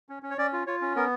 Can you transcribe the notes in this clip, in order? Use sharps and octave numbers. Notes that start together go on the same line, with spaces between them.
C#4
C#4
C#5
C#4 D5
F4
F4 C#5
C#4
B3 A#4